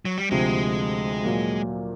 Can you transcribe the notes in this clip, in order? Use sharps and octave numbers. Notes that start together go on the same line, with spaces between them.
F#3
G3
D2 C3 F3 G#3
A#2 F#3 A#3